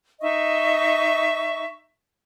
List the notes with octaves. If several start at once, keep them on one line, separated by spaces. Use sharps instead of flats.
D#4 D#5 E5 C#6